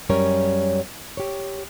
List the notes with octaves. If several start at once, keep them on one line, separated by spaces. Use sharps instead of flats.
F#2 G3 C#4 A#4 C#5
G4 C#5